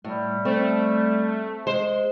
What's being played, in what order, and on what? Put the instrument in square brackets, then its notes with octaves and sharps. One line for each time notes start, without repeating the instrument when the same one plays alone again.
[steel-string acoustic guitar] A2 [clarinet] G3
[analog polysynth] A3 [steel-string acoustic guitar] C4
[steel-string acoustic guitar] G#3 [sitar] C5